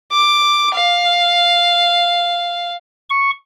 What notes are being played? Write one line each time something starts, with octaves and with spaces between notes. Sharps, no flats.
D6
F5
C#6